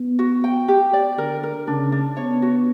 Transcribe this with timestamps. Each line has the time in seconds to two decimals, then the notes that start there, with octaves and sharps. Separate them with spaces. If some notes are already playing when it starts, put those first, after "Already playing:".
Already playing: B3
0.19 F#4
0.44 G5
0.68 G4
0.93 D5
1.18 D3 A#4
1.43 A#4
1.67 C#3 D4
1.92 D4
2.17 B3 C#5
2.42 F#4